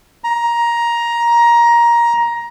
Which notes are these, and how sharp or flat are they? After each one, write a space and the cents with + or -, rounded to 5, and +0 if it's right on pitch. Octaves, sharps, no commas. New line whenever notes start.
A#5 +15